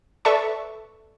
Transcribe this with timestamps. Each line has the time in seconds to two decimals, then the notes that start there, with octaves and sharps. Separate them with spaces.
0.25 A4 B4 D5 E5 A5 C#6